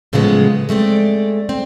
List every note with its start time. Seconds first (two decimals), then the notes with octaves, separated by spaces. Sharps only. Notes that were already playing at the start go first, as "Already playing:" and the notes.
0.13 A2 C#3 F3 F#3 G#3 B3
0.69 G#3 A3 C4 D5
1.49 C4